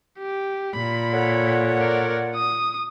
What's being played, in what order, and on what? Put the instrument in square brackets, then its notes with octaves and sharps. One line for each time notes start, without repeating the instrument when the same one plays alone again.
[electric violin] G4
[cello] A#2 [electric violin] B5
[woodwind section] A4 C#5 F#5
[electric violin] A#4 D5
D#6